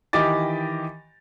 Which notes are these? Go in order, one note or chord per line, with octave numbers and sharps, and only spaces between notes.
D#3 E3 G4 D#5 D6 A6